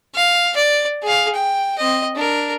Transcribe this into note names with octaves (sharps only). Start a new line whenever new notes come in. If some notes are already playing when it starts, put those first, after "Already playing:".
F5
D5
G#4 F5
G5
C4 D#5
D4 A#4